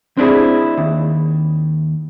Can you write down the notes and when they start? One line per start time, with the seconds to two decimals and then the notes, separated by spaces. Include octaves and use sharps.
0.17 C4 D4 E4 G#4 C5
0.78 D#2